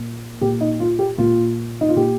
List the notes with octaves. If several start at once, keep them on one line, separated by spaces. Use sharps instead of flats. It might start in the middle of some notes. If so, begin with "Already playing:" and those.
Already playing: A#2
A#2 G4
D#4
F4
G4
A#2 F4
D#4
F4
A#2 G4